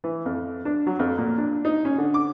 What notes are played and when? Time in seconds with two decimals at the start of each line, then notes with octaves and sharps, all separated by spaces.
0.04 E3
0.26 F2
0.65 D4
0.87 F#3
0.99 F2
1.18 A#2
1.38 D4
1.65 D#4
1.85 C#4
1.98 D3
2.14 D6